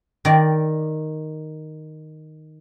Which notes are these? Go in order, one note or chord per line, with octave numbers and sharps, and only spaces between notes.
D#3 D5